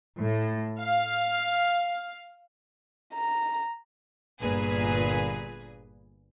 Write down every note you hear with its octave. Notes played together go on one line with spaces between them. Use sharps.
A2
F5
A#5
G1 A#2 G#4 B4